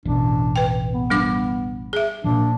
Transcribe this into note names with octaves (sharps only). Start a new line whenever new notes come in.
A1 E2 B2 D4
B4 G5
B3
G3 D4 D6
G#4 E5
A#2 F3 D4